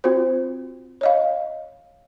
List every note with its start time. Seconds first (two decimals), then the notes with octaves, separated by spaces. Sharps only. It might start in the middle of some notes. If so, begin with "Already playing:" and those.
0.04 C4 F4 F#4 C5
1.01 C#5 D#5 F5